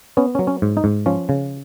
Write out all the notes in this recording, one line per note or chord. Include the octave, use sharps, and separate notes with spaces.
B3 C#4
C#4
F#3
C#4
G#2
D#4
G#2
F3 C#4
C#3